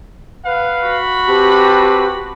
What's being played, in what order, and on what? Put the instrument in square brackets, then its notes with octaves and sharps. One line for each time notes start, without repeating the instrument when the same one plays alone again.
[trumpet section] B4 F5 F#5
[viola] F#4 B5
[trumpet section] C4 B4 A5 [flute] G4